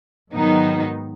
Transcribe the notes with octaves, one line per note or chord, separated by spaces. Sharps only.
G#2 D#3 F#3 B3 D#4